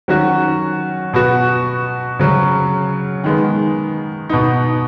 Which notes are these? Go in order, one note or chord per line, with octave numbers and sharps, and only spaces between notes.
D#3 F#3 C#4 F#4
B2 B3 F#4
C#3 F#3 C#4
D#3 G#3 B3
B2 B3 D#4